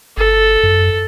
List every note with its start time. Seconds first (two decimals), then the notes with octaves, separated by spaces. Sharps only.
0.17 G1 A4
0.63 F#2